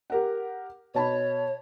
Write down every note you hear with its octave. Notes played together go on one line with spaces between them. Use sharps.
G4 A#4 F#5
B2 C#5 A5 B5